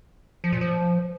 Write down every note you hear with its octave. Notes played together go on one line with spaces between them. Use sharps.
F3
A#2
F3